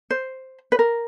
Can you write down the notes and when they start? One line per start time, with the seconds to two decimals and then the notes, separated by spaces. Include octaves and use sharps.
0.11 C5
0.72 B4
0.79 A#4